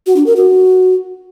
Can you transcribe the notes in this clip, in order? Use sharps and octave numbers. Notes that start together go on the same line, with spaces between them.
F#4
D4
A#4
F#4